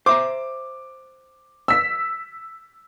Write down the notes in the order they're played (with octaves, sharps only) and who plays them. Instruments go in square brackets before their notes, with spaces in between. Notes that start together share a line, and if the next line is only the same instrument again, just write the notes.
[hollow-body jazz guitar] C5 E5 A#5 [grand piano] D6
[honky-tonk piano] E6 B6